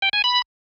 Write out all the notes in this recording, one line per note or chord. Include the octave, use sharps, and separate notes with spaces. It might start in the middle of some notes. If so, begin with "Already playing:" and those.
G5
G#5
B5